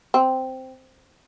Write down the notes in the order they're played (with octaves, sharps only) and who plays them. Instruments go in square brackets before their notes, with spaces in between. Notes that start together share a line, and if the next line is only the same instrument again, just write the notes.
[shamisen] C4